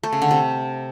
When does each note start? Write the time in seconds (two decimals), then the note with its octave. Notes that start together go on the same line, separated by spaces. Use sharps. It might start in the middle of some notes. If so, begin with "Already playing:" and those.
0.03 A3
0.13 C#3
0.22 D3
0.31 C3